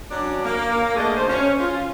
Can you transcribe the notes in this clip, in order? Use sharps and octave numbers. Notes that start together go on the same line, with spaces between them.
F#3 C#4 D4
A#3
D3 A3 D4 G#4 D#5
D2 A3 C5
C#4
F4